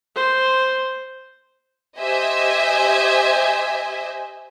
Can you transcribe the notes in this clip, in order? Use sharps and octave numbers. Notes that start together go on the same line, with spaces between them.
C5
G4 C5 D#5 E5 G#5